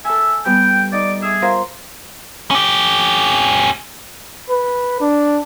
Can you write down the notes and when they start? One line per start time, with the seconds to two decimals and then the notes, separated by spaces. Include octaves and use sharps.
0.05 A4 E5 G#5
0.45 G3 B3 G4 G5
0.93 D#4 D5
1.22 G#4 E5 D6
1.42 F4 A#4 C5
2.50 C#4 G4
4.50 B4
5.01 D4